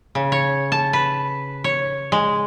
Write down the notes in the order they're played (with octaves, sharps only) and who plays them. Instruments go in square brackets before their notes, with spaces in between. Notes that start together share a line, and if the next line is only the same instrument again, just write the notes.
[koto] C#3
C#5
A5
B4
C#5
G#3